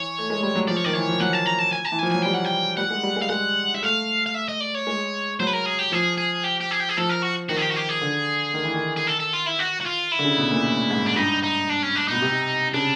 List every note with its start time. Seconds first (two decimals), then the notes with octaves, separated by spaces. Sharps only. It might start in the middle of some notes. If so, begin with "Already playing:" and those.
Already playing: E3 C#5
0.19 A3
0.30 G#3
0.43 G3
0.55 F#3
0.68 F3 D5
0.76 C#5
0.84 D#3 D5
0.94 E3 C#5
1.09 F3
1.20 F#3 F#5
1.33 A5
1.46 A#5
1.59 A5
1.73 G#5
1.85 A5
1.92 E3
1.99 F3 G#5
2.12 F#3 G#5
2.23 G3 G5
2.34 F#5
2.45 G5
2.77 G3 F#5
2.90 G#3
3.03 G3
3.16 G#3
3.22 F5
3.29 G#3 F#5
3.74 E5
3.82 A3 F5
4.26 F5
4.34 E5
4.48 D#5
4.61 D5
4.75 C#5
4.87 G#3
5.40 F#3 C5
5.47 B4
5.53 A#4
5.66 G#4
5.79 G4
5.92 F3 G#4
6.18 G#4
6.44 G4
6.60 G4
6.71 G#4
6.80 G4
6.89 G#4
6.97 F3 A4
7.10 A#4
7.23 F#4
7.49 D#3 F#4
7.57 G#4
7.62 G4
7.71 F#4
7.76 G4
7.89 G#4
8.01 D3
8.54 D#3
8.65 E3
8.74 D#3
8.96 G#4
9.07 A4
9.19 A4
9.33 F4
9.46 E4
9.59 F#4
9.80 F#4
9.86 F4
10.12 E4
10.19 D3
10.25 C#3
10.38 B2
10.51 A#2
10.64 A2
10.91 G#2
11.06 D4
11.16 G2 D#4
11.43 D#4
11.69 D4
11.83 C#4
11.95 D4
12.08 B2 D#4
12.22 C3
12.74 C#3 D4